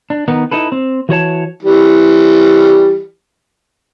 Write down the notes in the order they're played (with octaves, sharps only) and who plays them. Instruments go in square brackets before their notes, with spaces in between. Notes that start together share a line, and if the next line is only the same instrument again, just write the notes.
[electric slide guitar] D4
D#3 B3 D#4
D#4 E4 A4 B4
C4
E3 F#4 C#5 A5
[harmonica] E3 G3